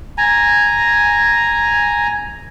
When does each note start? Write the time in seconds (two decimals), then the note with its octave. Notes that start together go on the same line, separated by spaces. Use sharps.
0.18 G#5 A#5